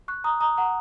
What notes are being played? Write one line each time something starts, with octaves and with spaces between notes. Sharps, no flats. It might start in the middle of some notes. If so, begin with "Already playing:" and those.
C#6 F#6
A#5 D#6
A#5 D#6
F#5 A#5